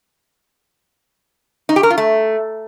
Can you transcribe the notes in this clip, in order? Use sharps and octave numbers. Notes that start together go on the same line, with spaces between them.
D#4
G4
A#4
F4
A3